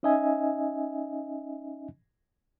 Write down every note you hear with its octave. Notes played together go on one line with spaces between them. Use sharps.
C#4 D#4 D#5 E5 G#5